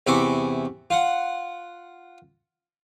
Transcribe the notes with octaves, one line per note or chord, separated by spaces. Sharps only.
E2 C3 E4 G#5 C#6 D6
F4 F#5